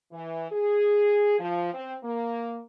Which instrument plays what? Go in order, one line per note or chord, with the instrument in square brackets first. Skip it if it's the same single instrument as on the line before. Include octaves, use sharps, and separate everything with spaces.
[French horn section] E3
G#4
F3
C4
A#3